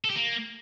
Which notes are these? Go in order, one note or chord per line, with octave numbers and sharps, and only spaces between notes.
A4
G4
A#3